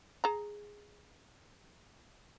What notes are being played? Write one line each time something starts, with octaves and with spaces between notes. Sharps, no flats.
G#4 A#5